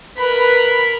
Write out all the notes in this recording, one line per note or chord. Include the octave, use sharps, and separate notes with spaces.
A#4 B4 B5